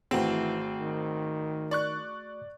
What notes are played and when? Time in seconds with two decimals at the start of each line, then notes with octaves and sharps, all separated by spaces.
0.11 G#1 E3 A3 C4 F#4 G#4
0.80 D#3
1.71 D5 C#6 F#6